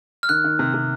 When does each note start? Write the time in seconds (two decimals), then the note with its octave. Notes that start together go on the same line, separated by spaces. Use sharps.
0.23 F6
0.29 D#3 F#6
0.44 D#3
0.59 C3
0.74 C3